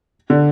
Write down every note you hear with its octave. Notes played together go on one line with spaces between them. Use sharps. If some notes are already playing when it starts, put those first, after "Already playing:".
D3